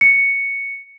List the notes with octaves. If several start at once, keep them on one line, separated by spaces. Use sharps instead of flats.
C#7